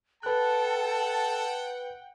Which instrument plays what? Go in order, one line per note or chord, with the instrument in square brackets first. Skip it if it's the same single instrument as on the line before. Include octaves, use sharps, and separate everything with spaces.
[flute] A4 [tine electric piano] B4 F#6 [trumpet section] F#5 G5 [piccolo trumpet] A5